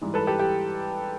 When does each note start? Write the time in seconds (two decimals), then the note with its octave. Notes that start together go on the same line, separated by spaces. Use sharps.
0.01 G#2 E3 G3
0.14 A4 B4
0.27 G4 A4
0.39 G4